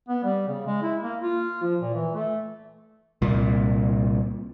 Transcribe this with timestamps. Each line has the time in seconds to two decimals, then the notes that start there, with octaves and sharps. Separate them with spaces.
0.08 B3
0.24 G3
0.48 C#3
0.66 G#3
0.82 E4
1.03 A#3
1.23 F4
1.63 F3
1.81 A#2
1.94 E3
2.14 A3
3.22 C2 A#2